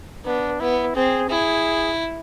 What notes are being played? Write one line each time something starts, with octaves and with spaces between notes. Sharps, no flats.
B3 D4
B3 E4
C4 G#4
E4 G#4